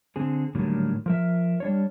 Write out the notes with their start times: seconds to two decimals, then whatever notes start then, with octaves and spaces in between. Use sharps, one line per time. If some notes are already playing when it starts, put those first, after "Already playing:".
0.16 D3 C4 G#4
0.55 A2 D3 D#3 F#3 G3 A#3
1.06 F3 A#4 E5
1.60 G3 D4 C#5